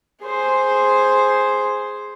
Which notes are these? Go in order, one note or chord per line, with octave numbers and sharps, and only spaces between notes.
G#4 C5